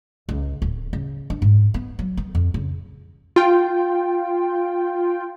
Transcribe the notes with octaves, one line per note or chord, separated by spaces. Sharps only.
C#2
D1
C#3
D4
G#2
B3
F#3
B3
F2
C#3
F4 G5